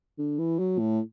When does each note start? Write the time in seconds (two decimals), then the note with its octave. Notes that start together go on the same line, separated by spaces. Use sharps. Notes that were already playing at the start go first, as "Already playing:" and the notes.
0.19 D3
0.39 E3
0.59 F#3
0.79 A2